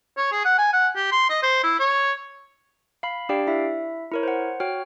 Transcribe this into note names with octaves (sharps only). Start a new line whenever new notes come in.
C#5
G#4
F#5
G#5
F#5
G4
C6
D#5
C5
E4
C#5
F5 B5
D4 G4 D5 F5 G5
E4 E5
E4 A#4 C#5
C5 F#5
F#4 C#5 G5 F6